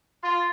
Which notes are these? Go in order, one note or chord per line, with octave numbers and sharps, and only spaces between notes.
F4